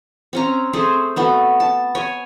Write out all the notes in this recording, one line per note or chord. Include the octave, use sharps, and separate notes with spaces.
C4 C#4 A#5
A3 C4 G#4 C5
A3 B3 F#4
A5
C#5 G#5